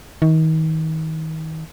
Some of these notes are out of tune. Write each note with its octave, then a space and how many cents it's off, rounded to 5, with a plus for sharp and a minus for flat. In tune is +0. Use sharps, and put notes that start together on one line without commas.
D#3 +35